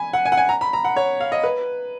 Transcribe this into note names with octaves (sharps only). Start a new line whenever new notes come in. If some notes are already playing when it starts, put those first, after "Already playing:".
Already playing: G#5 B5
F#5
G#5
F#5
G#5
A#5
B5
A#5
F#5
C#5
F5
D#5
B4